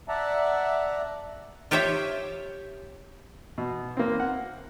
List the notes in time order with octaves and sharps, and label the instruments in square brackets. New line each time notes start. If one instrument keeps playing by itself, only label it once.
[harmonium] D5 E5 F#5 A5 A#5
[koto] F4 G4 C5 C#5 E5 G5
[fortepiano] B2
A#3 C4
F#5